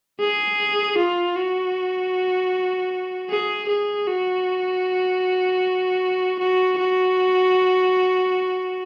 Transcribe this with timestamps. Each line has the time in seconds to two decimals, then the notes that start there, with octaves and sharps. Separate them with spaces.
0.20 G#4
0.97 F4
1.36 F#4
3.29 G#4
3.68 G#4
4.07 F#4
6.39 F#4
6.78 F#4